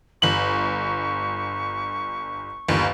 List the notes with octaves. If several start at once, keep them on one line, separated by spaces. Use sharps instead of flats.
G1 C#6 F#7
G1 D#2